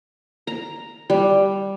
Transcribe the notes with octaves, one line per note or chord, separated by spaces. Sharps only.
A#5
G3